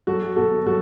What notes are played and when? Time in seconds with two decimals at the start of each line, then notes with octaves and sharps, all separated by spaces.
0.07 F#3 F#4 A4
0.36 B2 F#4 A4
0.66 F#3 F#4 A4